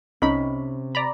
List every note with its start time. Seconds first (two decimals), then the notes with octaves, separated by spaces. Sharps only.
0.22 C2 C3 C#4 D#4 B5
0.95 D5 A#5 B5